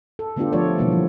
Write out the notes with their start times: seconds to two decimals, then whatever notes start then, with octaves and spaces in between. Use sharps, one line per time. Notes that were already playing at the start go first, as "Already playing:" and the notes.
0.19 A4
0.36 D3 A3 B3 D4 F4 G4
0.53 F3 A3 A4 C#5 D5
0.78 B2 D3 E3 G3 A#3 B3
0.92 F3